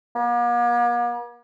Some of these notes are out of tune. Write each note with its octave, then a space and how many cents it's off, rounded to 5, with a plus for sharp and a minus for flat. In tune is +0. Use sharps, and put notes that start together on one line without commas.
A#3 +45